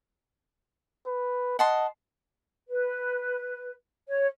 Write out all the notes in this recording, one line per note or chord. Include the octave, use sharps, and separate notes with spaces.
B4
D#5 F#5 A5 C6
B4
C#5